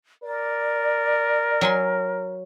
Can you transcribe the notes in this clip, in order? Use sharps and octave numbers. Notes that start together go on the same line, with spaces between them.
A#4 D5
F#3 G#5 C6